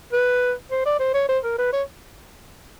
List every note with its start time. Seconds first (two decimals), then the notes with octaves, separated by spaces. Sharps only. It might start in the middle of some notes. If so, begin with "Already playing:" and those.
0.12 B4
0.71 C5
0.86 D5
1.00 C5
1.14 C#5
1.28 C5
1.44 A#4
1.58 B4
1.73 C#5